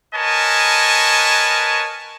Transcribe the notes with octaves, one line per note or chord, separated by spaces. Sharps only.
A#4 B4 C#5 D#5 G#5 A5